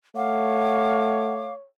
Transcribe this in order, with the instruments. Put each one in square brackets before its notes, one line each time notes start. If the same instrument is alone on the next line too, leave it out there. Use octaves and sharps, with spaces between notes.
[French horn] A3 [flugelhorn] C#5 [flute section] F5 D6 [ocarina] F#5